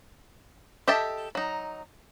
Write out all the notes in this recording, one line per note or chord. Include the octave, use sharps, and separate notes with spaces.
G4 A4 D#5 E5 A5
F#3 D#4